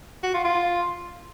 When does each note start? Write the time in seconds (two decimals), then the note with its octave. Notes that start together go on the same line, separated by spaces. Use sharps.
0.23 F#4
0.34 F4
0.44 F4